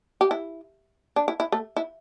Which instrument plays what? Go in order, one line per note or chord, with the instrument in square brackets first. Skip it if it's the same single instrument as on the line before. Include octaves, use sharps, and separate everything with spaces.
[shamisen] G4
E4
D4
E4
E4
A3
E4